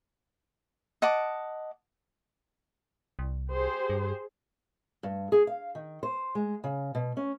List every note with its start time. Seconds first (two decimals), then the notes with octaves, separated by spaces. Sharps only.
1.02 D#5 F#5 A5 D6
3.19 C2
3.51 G4 G#4 C5
3.90 G2
5.03 G2
5.32 G#4
5.47 F5
5.75 D#3
6.03 C5
6.35 G#3
6.64 C#3
6.95 B2
7.17 C#4